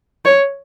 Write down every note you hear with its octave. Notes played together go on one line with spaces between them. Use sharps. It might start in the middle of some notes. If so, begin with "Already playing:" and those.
C#5